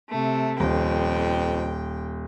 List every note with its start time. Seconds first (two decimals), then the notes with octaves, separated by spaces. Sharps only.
0.10 C3 A3
0.60 D#1 F2 G5